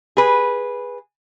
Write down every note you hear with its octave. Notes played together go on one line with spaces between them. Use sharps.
G#4 B4